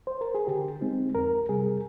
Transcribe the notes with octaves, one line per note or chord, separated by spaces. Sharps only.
C5
A#4
G#4
D3 G4
G#3 C4 D#4
F2 A#4
C3 G3 G#4